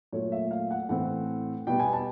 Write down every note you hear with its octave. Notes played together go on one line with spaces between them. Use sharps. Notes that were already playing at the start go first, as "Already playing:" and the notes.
A#2 F#3 A3 C#5
E5
F5
F#5
A2 E3 A3 C4 F#5
B2 G3 B3 G5
G#5
A5